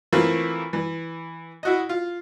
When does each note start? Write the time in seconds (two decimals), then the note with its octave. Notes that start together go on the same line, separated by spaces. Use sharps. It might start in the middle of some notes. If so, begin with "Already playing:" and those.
0.13 E3 A3 A#3 C4 E4 F4
0.73 E3
1.63 E4 F#4 D#5
1.89 F4